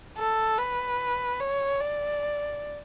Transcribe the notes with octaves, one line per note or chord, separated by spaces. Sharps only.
A4
B4
C#5
D5